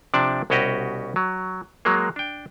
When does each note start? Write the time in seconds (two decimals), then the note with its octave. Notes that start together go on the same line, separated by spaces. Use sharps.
0.14 C3 F3 D4 C5 D5 A5
0.50 C2 B2 C#4 F#4 G4 D#5
1.16 F#3
1.85 F#3 G#3 A#3
2.16 D4 G5